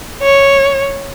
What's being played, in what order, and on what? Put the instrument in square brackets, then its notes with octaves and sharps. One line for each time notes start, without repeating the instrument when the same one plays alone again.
[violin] C#5